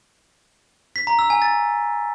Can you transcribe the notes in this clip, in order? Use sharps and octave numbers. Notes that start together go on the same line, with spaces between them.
B6
A#5
E6
G#5
A6